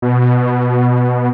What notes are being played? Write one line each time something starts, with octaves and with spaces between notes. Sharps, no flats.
B2